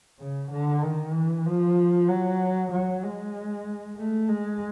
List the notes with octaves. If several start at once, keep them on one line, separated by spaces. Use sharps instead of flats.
C#3
D3
D#3
E3
F3
F#3
F#3
G#3
A3
G#3